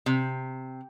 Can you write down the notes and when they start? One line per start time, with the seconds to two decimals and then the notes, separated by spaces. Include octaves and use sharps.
0.06 C3